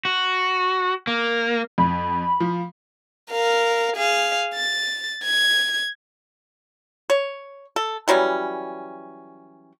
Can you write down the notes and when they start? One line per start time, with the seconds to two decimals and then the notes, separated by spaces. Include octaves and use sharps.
0.05 F#4
1.07 A#3
1.78 F2 B5
2.40 F3
3.31 A#4 F5
3.96 G#4 F5
4.54 A6
5.24 G#6
7.10 C#5
7.76 A4
8.08 E3 F#3 G3 C#4